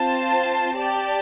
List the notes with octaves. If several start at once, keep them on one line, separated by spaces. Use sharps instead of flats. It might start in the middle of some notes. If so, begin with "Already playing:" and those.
Already playing: C4 F4 C5 A5
G4 D5 A5